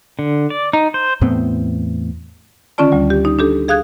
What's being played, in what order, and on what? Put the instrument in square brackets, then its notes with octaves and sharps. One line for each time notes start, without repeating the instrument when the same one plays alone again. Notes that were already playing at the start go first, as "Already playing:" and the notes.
[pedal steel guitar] D3
D5
D#4
C5
[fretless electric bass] E2 A2 B3 C4
[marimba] D3 D#3 C#4 F4 D5 A5
D2 G3
G4
D#4
D4 G4 A4
G#4 F5 D#6 F#6 G#6